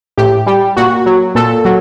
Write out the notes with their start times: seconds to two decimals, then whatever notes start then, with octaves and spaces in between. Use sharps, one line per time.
0.18 A2 G4
0.46 G3 G4
0.76 A#2 F#4
1.06 F#3
1.35 A#2 A4
1.65 F#3